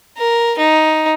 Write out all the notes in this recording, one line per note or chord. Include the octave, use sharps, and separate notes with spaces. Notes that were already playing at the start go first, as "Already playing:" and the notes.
A#4
D#4